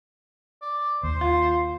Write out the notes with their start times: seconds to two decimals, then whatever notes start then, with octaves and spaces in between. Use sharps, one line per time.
0.62 D5
1.03 D#2 C5
1.21 F4